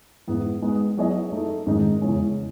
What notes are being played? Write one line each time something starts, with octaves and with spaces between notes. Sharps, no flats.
G#2 E3 B3
G#3 B3 D#4
F#3 B3 E4 G#4 D#5
A3 D#4 A4
G#2 D#3 G#3 D#4
E2 C#3 E3 G#3 C#4